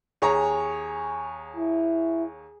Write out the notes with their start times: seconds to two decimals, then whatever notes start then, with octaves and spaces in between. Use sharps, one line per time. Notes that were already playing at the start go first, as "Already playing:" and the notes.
0.22 D#2 G#4 C#5 A#5
1.57 E4